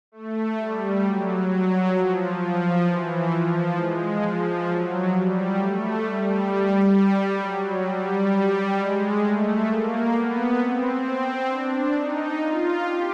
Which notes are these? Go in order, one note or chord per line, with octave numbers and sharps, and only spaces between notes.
A3
G3
F#3
F#3
F3
F3
E3
F3
G#3
F3
F#3
G3
A3
G3
F#3
G3
G#3
A3
A#3
B3
C4
C4
D4
D#4
F4
G4